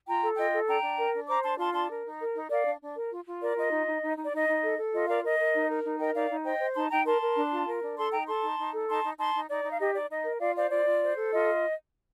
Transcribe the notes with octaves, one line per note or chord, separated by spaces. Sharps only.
F4 G5 A#5
A4
F4 D#5 G5
A4
D4 G5 A#5
D4
A#4
D4
C5 A#5 D6
D4 A5 C6
F4 A5 C6
D4 A5 C6
A#4
D#4
A#4
D#4
A#4 D5 F5
D4
D4
A#4
F4
F4
A#4 D5
F4 D#5
D#4
D#4
D#4
D#4
D5
D#4 D#5
D#4
A4
A4
F4 D#5
A#4 D5 F5
A#4 D#5
A#4
D#4
A#4
D#4
A#4 D#5 G5
D#4 D5 F5
D#4
C5 D#5 G5
C5
D#4 A5 C6
D#4 G5 A#5
A#4 A5 C6
A#4
D4
F4
A#4
D4
A4 A5 C6
D#4 G5 A#5
A4 A5 C6
D#4
D#4
A4
D#4 A5 C6
D#4
D#4 A5 C6
D#4
D#4 D5
D#4
F5
G4 D#5
D#4 D5
D#4 D#5
A#4
F4 D5 F5
C5 D5 F5
F4 D5
F4
C5
A4
F4 D#5